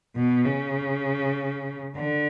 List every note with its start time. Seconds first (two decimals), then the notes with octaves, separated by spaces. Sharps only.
0.16 B2
0.45 C#3
1.96 D3